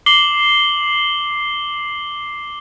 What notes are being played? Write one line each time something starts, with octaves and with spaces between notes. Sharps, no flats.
D6 C7 F#7 G7